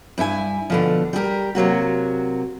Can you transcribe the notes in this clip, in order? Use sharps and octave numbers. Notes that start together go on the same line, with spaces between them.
G2 E4 A4 G#5
B2 D3 F3
G3 G4 G#4 A#4
C3 F#3 A#3 F#4